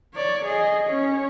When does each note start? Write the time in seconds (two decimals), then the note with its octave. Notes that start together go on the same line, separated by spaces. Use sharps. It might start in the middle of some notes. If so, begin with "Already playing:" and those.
0.14 C#5 D5
0.45 G#4 D#5
0.87 C#4 C#5